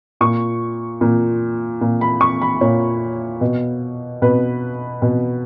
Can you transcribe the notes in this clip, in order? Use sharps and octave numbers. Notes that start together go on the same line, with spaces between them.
A#2 C#6
A#2
A#2
B5
C#6
B5
A#2 C#5
B2
B2 B4
B2